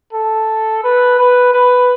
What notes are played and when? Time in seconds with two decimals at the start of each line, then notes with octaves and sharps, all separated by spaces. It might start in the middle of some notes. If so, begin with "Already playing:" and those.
0.13 A4
0.84 B4
1.19 B4
1.54 B4